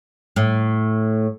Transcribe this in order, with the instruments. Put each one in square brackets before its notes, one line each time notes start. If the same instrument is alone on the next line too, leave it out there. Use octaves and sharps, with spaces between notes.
[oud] A2